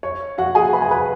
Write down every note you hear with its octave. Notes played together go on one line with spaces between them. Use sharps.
C#5
F#4 F#5
G#4 G#5
B4 B5
G#5
B4 B5